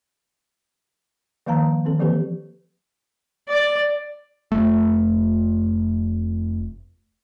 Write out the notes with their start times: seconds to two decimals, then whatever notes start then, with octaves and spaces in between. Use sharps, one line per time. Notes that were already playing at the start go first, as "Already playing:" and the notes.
1.46 D#3 F3 A#3 F5 A5 A#5
1.85 D#3 C4 A4
1.99 E3 F3 A#3 G4 B4
3.48 D5
4.52 F1 A3